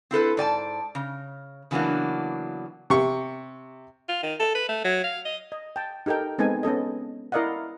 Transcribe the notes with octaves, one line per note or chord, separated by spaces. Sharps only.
C4 E4 A4 B4
G#2 D5 G#5 A5
C#3
C#3 E3 F#3 A#3 B3 D4
C3 C#6
F4
D#3
A4
B4
A3
F#3
F5
D#5
D#5
G5 A5
D#4 G4 A4 A#4 G5
G#3 B3 C4 D#4 A4 G#5
B3 C#4 A4 D#5
E4 A#4 D5 D#5 F5 F#5